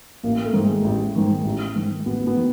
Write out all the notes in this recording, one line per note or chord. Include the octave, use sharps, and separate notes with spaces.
A1 A#3
A3
G#2 D#3
G#3
A1
G#2 D#3
A1
G#2 D#3
A1 B3
B3
D#3